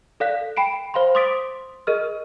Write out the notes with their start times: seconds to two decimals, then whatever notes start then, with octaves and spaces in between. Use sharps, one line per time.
0.20 A4 D5 F5 F#6 B6
0.57 G5 B5 C7 D7
0.94 C5 F5 B5 C6
1.15 C6 D6 D#6 A6 B6 D7
1.87 G#4 A#4 D#5 C#6 F6